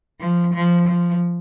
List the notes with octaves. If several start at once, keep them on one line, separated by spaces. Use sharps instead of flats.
F3
F3
F3